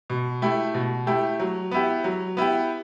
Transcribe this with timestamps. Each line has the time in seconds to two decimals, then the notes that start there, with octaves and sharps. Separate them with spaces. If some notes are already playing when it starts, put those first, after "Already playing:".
0.10 B2
0.42 A3 E4 G4
0.74 B2
1.06 A3 E4 G4
1.40 F#3
1.71 B3 E4 G4
2.04 F#3
2.37 B3 E4 G4